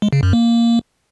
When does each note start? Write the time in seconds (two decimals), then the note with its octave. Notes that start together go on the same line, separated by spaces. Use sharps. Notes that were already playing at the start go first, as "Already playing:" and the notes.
0.02 G#3
0.13 C#3
0.23 F#2
0.33 A#3